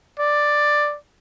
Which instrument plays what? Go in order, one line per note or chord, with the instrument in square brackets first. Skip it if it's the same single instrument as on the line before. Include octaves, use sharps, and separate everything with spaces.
[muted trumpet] D5